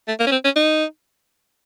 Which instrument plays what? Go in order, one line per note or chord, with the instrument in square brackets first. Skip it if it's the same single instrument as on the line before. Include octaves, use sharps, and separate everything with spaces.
[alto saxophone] A3
A#3
C#4
C4
C#4
D#4